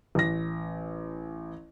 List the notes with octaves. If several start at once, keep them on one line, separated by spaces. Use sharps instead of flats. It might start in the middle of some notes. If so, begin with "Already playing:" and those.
A1 A#6